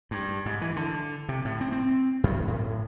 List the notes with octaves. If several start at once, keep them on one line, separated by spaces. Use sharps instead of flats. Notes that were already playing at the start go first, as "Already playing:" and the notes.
G2
G#2
E3
D3
C3
A2
C4
C4
F#2
A2